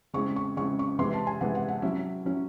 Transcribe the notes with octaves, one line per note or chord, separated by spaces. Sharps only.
C#3 G#3 C4 E4 C#6
C#6
C#3 G#3 C4 E4 C#6
C#6
C3 E3 G#3 C6
A5
G#5
C3 E3 G#3 F#5
F#5
F#5
F#3 C#4 E4 E5
F#3 C#4 E4